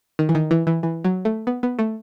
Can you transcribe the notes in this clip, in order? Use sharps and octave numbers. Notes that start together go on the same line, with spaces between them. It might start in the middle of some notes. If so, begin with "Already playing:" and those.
D#3
E3
D#3
E3
E3
E3
F#3
A3
B3
B3
A3